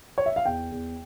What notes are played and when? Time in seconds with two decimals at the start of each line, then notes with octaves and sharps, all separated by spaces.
0.18 C#5
0.26 E5
0.36 F5
0.45 E2 G5
0.71 E2